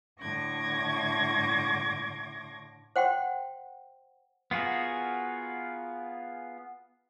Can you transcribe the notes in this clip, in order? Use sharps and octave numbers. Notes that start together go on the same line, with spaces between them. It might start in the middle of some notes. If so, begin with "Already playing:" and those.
A2 D3 C#6 D6 G#6 A#6
C5 F#5 G5 C6
B3 F4 F#4 G#4 A#4